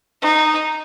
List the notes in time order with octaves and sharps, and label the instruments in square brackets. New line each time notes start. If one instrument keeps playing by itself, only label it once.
[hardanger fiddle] D#4